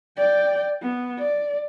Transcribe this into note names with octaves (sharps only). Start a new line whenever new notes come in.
D5 G5
B3
D5